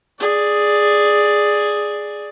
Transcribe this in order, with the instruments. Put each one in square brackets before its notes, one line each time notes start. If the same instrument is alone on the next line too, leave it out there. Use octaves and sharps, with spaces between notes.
[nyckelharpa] G#4 D5